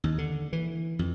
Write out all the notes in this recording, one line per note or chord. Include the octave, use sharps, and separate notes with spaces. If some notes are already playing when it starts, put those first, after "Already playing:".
D#2
D3
E3
F2